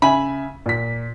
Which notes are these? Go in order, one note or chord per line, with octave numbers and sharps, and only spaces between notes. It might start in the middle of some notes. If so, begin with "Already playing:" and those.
C#3 E5 G#5 B5
A#2 B6